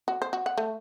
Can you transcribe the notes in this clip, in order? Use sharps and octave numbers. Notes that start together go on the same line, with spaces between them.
F#4
C5
F#4
F#5
A3